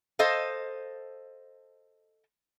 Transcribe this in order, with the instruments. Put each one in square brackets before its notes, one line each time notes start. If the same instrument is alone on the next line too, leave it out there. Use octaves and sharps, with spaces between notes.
[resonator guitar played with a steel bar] A4 C5 D#5 F5